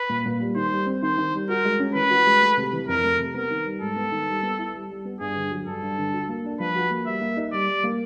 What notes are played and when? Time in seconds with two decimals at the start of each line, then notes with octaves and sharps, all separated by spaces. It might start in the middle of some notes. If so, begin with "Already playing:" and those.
Already playing: B4
0.09 A#2
0.26 A#2
0.40 G3
0.55 D#3 C5
0.71 G3
0.86 C4
1.02 D#3 C5
1.18 D#3
1.34 G3
1.49 F#4 A#4
1.65 G#3
1.80 C#4
1.95 E3 B4
2.10 F#4
2.26 G#3
2.42 A3
2.57 C3
2.73 E3
2.88 F2 A#4
3.04 A3
3.19 C3
3.34 B3 A#4
3.50 D#3
3.65 G3
3.81 G#2 A4
3.96 B3
4.12 D#3
4.28 G3
4.43 B3
4.58 E4
4.74 G3
4.90 G3
5.05 B3
5.20 G2 G#4
5.36 D3
5.51 F#3
5.66 G2 A4
5.82 G2
5.98 D3
6.14 F#4
6.29 A#3
6.44 D4
6.60 F3 B4
6.76 F#4
6.91 A#3
7.06 G3 E5
7.21 A#3
7.37 D#4
7.52 G3 D5
7.68 G3
7.84 A#3